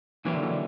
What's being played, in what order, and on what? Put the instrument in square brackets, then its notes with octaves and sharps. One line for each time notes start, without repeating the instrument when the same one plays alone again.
[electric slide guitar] A#2 F#3 A#3 C#4 G4 [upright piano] E3
[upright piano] D3
E3
D3